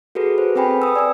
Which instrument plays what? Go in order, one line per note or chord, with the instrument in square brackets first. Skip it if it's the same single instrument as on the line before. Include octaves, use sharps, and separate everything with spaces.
[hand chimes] F#4 G#4 A4 B4
C5
C4 A4 B4 G5 G#5 B5
D#6 E6
D5 G#5 E6